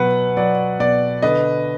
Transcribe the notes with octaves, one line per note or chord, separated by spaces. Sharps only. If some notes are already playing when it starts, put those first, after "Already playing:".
Already playing: B2 F#3 B4 F#5
F#3 D5
B2 D5
D3 B4 D#5